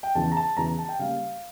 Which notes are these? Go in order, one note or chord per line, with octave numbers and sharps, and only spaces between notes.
G5
E2 C#3 E3 A5
A#5
A5
E2 C#3 E3 A#5
A#5
A5
G5
C#3 G3 A#3 F5